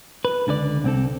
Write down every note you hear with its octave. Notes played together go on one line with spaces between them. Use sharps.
B4
C#2 D3 A4 D5
C2 C4 A4